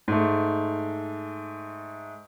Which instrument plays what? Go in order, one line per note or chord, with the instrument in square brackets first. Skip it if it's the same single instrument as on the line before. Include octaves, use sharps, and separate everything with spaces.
[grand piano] G#2 A3